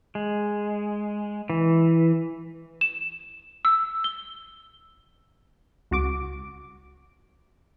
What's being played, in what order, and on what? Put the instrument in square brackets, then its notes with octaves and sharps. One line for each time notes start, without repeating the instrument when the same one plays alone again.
[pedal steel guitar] G#3
E3
[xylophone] E7
E6
G7
[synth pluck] C#2 F#4 D6